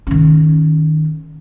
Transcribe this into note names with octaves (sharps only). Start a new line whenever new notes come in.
D#3 C#4